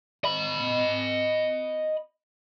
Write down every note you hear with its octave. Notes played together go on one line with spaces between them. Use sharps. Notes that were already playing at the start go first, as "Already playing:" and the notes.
D#5 B5